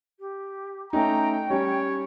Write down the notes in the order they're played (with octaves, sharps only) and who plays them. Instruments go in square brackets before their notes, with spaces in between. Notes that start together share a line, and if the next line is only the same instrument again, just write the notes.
[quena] G4
[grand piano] A3 C#4 D#4 [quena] G5 [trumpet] A#5
[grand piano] G3 C#4 [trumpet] C#5